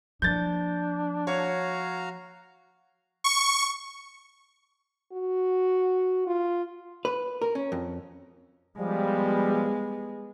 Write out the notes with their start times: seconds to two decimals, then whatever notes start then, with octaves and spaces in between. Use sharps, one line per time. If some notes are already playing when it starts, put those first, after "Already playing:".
0.22 F3 A#3 D4 G6 A6
1.27 F#4 C#5 F5 A#5
3.24 C#6
5.12 F#4
6.27 F4
7.05 B4
7.42 A#4
7.55 C#4
7.72 F2
8.79 F3 G3 G#3 B3